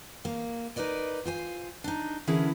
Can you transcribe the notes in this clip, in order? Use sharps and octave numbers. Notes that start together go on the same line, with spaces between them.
A#3
D#4 A#4 B4 D5 D#5
F4 C5 G#5
D4 D#4
D3 E3 C#4 E4 G#4 A#4